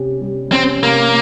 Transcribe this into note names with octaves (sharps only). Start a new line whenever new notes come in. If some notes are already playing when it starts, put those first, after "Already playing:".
Already playing: C3 C#4 G4
G3
C4 C#4
C3 A#3